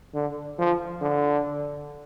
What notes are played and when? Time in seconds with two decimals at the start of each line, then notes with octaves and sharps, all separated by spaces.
0.14 D3
0.58 F3
1.01 D3